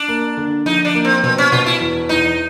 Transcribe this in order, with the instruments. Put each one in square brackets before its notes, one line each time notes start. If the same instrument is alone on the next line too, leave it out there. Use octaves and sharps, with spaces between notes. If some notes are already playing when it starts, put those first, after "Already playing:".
Already playing: [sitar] D4
[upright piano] A#3
D3
[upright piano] F3 [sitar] D#4
[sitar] D4
[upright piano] A#3
[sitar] C4
[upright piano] B2 [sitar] C4
[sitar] C#4
[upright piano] B2 [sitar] F4
[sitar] E4
[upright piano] E2
[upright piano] E2 [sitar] D#4